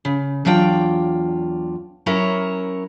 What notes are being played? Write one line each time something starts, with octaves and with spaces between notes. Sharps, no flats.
C#3
E2 F#3 D4 F4 G5
F#3 C#4 E4 A#4 C#5